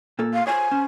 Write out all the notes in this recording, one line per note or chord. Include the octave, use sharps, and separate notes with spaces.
A#2 A#3 A4
F5
F4 C5 C#5 G#5
C#4 C5